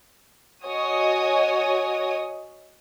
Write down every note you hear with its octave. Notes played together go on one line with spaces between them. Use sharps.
F#4 C#5 D#5 G#5 D#6